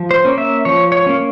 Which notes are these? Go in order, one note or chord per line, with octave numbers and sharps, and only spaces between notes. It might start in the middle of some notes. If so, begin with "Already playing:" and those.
Already playing: F3
C5
A#3 C#4
E5
F3 C#5
C#5
A#3 C#4